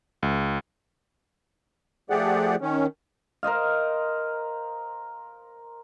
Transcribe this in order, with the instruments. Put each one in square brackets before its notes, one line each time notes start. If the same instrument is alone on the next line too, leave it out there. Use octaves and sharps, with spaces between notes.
[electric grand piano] C#2
[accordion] F3 A3 G4 G#4 D5 F#5
D#3 C#4
[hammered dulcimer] A#4 C5 D#5 F5